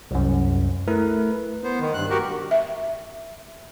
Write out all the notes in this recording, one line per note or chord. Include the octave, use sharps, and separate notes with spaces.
C2 F#2
A3 E4 A#4 B4
B3 C5
D#3
G2 F#6
F#4 G4 A#4
E5